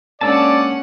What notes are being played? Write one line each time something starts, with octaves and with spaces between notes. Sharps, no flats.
G#3 A#3 C#4 D4 D5 F#5 A5 E6